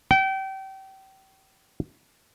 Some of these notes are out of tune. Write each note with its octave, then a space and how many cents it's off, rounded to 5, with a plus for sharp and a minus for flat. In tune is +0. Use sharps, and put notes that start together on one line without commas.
G5 -30